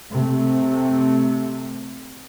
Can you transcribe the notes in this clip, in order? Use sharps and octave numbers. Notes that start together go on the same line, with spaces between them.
C3 A3